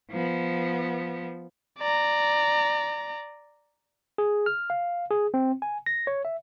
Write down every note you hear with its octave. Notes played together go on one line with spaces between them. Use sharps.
F3 B3
D5 A#5
G#4
F6
F5
G#4
C4
G#5
A#6
C#5
E5